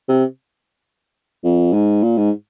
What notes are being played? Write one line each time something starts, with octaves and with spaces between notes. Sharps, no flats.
C3
F2
G#2
A#2
G#2